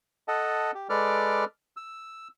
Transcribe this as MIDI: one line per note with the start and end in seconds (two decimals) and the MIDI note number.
0.28 0.71 69
0.28 0.71 75
0.28 0.71 78
0.28 0.71 81
0.75 0.87 67
0.89 1.45 56
0.89 1.45 69
0.89 1.45 71
0.89 1.45 74
0.89 1.45 86
0.89 1.45 89
1.77 2.28 88